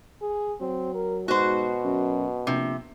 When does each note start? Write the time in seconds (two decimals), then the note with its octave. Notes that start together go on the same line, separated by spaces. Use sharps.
0.22 G#4
0.61 F#3 C4
0.94 A#4
1.28 G#2 B2 F#4 C5
1.84 F#2
2.47 A#1 C3